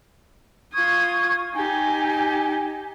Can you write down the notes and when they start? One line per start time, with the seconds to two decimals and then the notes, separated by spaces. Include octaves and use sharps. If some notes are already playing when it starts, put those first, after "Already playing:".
0.73 F4 C#6 D#6 G#6
1.54 D#4 G4 G#5